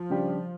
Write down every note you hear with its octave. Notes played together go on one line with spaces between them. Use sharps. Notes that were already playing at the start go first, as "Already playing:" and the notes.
Already playing: F3
C#3 G3 D4 G4